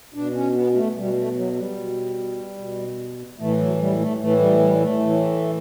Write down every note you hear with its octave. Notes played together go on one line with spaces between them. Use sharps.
B2 D4
C#4
B3
A3
B2 G3
A3
F#3
G3
B2
B2
A2 E3 A3
F#3
G3
A3
A2 E3 A3
G3
G3
A3
A2 E3